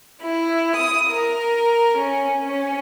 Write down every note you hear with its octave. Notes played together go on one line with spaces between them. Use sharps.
E4
D#6
A#4
C#4
C#4